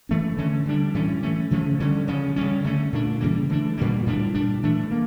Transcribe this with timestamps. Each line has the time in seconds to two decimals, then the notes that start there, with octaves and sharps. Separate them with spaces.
0.09 E3 A3 C#4
0.37 D3 A3 C#4
0.65 D3 G3 D4
0.94 A2 E3 G3 C#4
1.23 E3 A3 C#4
1.51 C#3 F3 A3 C#4
1.80 D3 G3 C#4
2.08 C#3 F3 C#4
2.36 C#3 G3 C#4
2.64 D3 A3 C#4
2.92 A#2 A3 D4
3.21 C#3 E3 G3 A#3
3.50 E3 A3 D4
3.78 A#2 G3 A#3
4.06 A2 G3 D4
4.34 A#2 G3 D4
4.63 E3 A3 D4
4.91 A#3